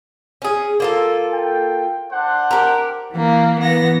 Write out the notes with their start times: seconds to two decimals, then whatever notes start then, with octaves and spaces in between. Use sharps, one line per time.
0.42 C#4 G#4
0.80 A#3 F4 A4
1.33 G5
2.11 D4 C5 F#5
2.51 G4 A#4
3.13 E3 A#3
3.59 E3 B3 A#6